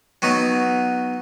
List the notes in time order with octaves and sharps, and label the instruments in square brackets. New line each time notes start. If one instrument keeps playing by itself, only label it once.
[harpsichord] F#3 B3 D#4